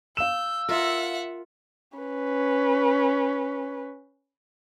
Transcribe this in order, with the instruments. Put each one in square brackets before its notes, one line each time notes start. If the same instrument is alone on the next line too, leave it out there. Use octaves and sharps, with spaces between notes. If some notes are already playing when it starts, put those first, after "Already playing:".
[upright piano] F5 E7 [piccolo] E6 [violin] G6
[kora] F4 A#4 [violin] E5 F#5
[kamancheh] C#4 B4